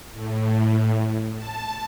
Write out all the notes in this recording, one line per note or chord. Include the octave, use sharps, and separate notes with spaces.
A2
A5